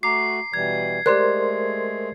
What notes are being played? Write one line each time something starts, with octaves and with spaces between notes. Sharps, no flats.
A3 F#4 A#5 D6 C7
B2 E3 G3 G#6
G#3 A3 G4 A#4 C5 D5 C6 F#6